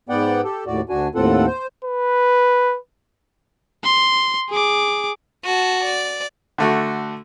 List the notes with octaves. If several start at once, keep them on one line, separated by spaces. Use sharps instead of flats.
G#2 B3 D5 F#5 G5
G4 A4
D#2 A2 F#4 D5
D2 D4 F#4 G#5
D#2 A2 C4 F4 A4 F#5
C5
B4
C6
G#4 D6
F#4 A5
D5
D3 A3 F#4